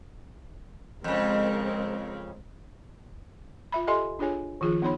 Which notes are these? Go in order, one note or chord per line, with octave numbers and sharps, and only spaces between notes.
F2 C#3 G#3 C4 A#4
F4 E5 B5
G4 A4 D#5 E5 G#5 C6
D4 F4 G#4 C#5 G#5
D#3 F3 F4 G#4
B3 D#4 C#5 B5